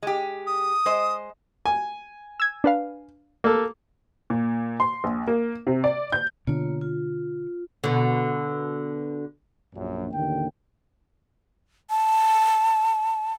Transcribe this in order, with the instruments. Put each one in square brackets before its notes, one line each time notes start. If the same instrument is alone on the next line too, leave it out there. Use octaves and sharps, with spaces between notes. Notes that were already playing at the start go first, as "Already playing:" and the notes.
[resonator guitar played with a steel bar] G#3 G4
[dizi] D#6
[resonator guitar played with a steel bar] G#3 C5 D#5
[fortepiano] G#5
[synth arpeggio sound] E6 G#6
D4 B4 F5
[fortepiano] A#3 A4
[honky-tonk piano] A#2
C6
A#1
A#3
C3
D5
G6
[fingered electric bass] B2 D3 [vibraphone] A#3 F4 C#5
[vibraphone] F4
[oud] B2 D3
[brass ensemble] A#1 F#2
A1 D#2 D3 A#3 G5
[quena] A5